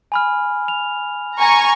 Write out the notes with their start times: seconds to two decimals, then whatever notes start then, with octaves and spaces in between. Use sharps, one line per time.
0.12 G#5 B5 F6
0.68 F7
1.39 G#5 A#5 C#6